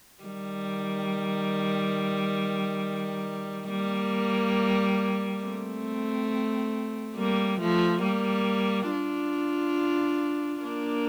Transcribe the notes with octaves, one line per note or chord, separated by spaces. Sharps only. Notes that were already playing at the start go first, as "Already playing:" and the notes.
D#3 G3
G3 A#3
A3 C4
G3 A#3
F3 A3
G3 A#3
D4 F4
A#3 D4